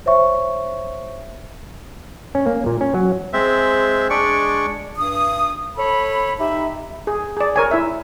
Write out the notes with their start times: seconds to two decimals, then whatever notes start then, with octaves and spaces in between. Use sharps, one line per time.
0.06 C5 C#5 E5 C#6
2.35 C#4
2.47 A#3
2.66 A#2
2.81 C#4
2.94 F#3
3.33 G#3 C4 E5
4.10 G#3 D4 D5 C#6
4.98 G2 D#6
5.77 A4 C#5 B5
6.39 D#4 G4 E5 B5
7.07 G#4
7.37 G#4 D5
7.56 A#4 C#5 G#5
7.71 E4 E5